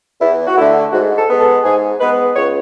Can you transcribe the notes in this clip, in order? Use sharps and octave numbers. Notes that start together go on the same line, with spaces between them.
E2 E4
F#4
D3 A3 E4
G#2 F#4
A4
G#3 B3
A4
G#2 G#4
G#3 B3 B4
C#2 C#5